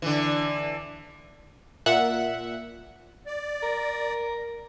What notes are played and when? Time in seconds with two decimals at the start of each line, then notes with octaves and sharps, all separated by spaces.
0.02 D3 E3
1.86 A#2 E5 F#5
3.26 D5
3.63 A#4